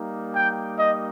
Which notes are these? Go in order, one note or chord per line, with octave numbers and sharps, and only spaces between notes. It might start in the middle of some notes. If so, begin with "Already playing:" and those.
Already playing: G3 A#3 D#4
G5
D#5